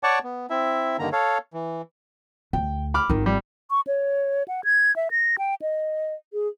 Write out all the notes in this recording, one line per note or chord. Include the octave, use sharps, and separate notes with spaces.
C#5 D5 F#5 A5 C#6 D6
B3
C4 E4 E5
G2 D3 D#3 A#3 A#5
A4 C#5 F5
E3
D2 G5
B5 D6 F6
G#1 D#3 F4
G3
C#6
C#5
F#5
G#6
E5
A#6
G5
D#5
G#4